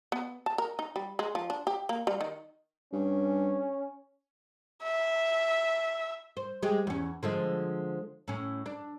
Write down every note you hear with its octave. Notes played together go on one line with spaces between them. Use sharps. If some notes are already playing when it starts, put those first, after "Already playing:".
B3
A5
A#4
D#4
G3
G#3
F3
D4
G4
A#3
G3
D#3
G2 C#4
E5
C5
G#3 G4
E2 C#4
D3 F3 G#3
A2 C#4
D4